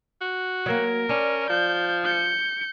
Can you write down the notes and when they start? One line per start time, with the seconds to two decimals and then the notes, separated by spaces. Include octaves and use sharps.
0.21 F#4
0.66 F#3 A#3 A#4
1.09 C#4 D4
1.49 F3 G6
2.04 G6 C#7